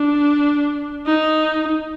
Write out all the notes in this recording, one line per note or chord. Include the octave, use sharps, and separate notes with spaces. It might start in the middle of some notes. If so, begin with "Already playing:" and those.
Already playing: D4
D#4